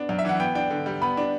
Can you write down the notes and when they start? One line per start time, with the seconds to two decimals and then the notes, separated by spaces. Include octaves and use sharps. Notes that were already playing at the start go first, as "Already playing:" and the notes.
Already playing: B3 D4
0.09 F#2
0.19 E5
0.25 E3 F#5
0.40 B3 G5
0.55 D4 G5
0.70 D3
0.86 G3
1.02 B3 B5
1.17 D4